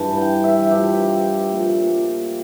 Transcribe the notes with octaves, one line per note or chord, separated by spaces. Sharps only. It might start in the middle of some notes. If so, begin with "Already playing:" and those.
Already playing: G2 E3 A5
G5
E5
G2 F3 G4
A#2 F3